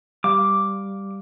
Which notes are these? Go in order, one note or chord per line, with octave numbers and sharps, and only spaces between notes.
G3 F5 D6